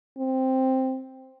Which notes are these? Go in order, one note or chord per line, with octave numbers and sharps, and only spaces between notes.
C4